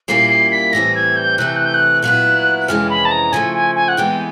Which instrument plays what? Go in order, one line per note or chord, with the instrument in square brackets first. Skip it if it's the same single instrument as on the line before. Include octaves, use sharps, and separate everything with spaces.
[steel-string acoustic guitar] A#2 G3 A#3 C#4 E4 [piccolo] C7
[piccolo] C7
B6
[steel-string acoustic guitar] A2 E3 G3 C4 [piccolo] A#6
[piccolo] G#6
G6
[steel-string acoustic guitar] C3 E3 A3 [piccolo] F#6
[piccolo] G6
F#6
G6
F#6
[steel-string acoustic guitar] A#2 F#3 B3 E4 [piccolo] F#6
[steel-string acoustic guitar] F2 C3 E3 G#3 C#4 [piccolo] F6
[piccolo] B5
A5
A#5
[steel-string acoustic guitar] C#3 F3 A3 [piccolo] G#5
[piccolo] G#5
G#5
F#5
[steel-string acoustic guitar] C3 E3 G#3 B3 [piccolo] G5